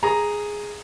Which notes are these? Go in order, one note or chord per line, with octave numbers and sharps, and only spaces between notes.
G#4 A#5